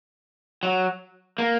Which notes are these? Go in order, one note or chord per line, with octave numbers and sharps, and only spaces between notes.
F#3
A#3